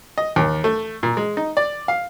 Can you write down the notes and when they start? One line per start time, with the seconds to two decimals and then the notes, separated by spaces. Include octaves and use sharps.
0.18 D#5
0.36 D#2
0.64 A3
1.03 A#2
1.17 G#3
1.37 D#4
1.57 D5
1.88 F5